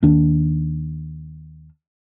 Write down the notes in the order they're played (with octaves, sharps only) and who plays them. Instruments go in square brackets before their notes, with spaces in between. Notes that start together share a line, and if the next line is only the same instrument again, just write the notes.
[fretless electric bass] D#2 D#3 D4